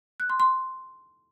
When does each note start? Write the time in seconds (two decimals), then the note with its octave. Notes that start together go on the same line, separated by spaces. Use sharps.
0.20 F#6
0.30 C6
0.40 C6